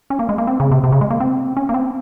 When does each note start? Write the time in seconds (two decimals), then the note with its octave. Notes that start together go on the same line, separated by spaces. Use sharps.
0.10 C#4
0.19 A#3
0.29 G#3
0.38 A#3
0.47 C4
0.60 C#3
0.72 C3
0.84 C3
0.92 C#3
1.01 G#3
1.10 A#3
1.20 C4
1.57 C#4
1.69 A#3
1.74 C4